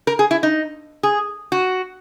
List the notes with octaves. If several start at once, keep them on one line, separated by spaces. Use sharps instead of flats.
A#4
G#4
E4
D#4
G#4
F#4